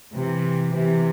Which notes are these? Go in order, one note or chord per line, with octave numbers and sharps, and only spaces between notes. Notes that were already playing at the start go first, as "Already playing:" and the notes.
C3 E3
C3 E3